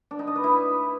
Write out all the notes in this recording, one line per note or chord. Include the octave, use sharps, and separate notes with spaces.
D4
D#4
D#5
B4
E4